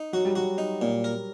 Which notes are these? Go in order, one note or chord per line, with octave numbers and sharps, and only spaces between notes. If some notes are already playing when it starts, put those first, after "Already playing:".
Already playing: D#4
F#3 F#4
G3
F#3 F#4
D#4
A#2
A#4